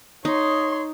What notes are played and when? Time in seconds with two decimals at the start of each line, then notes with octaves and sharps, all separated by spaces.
0.25 D#4 C#5 C6